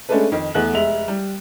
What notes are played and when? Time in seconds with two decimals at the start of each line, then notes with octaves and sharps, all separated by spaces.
0.09 G#3 A3 C#4 D4 A4 B4
0.32 F2 D#3
0.54 E2 A3 B3 F#6 F#7
0.74 F1 G#3 E5 F7 F#7
1.08 G3